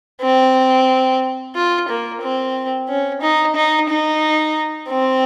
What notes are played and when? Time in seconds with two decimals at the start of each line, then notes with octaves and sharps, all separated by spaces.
0.22 C4
1.55 F4
1.88 A#3
2.22 C4
2.89 C#4
3.22 D#4
3.56 D#4
3.89 D#4
4.89 C4